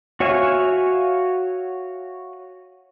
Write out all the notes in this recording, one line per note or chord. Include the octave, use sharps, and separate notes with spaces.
F#4 C#5 E5 F5 G#5